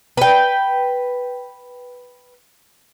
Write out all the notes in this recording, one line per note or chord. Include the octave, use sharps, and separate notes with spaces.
B4 G5